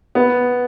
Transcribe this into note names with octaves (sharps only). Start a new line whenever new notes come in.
B3